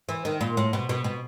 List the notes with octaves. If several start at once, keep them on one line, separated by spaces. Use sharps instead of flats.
E3
D#3
A#2
A2
B2
B2
B2